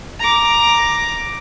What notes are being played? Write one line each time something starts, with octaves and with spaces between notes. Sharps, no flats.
A#5 D6